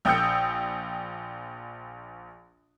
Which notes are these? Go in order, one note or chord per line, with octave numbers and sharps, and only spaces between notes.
A#1 G5 D#6 E6 G6 C#7